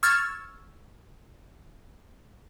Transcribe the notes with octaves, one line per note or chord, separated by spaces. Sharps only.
C#6 E6 F6 G#6 A6